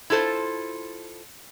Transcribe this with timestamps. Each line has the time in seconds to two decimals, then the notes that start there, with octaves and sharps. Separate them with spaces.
0.10 E4 F4 A4 C5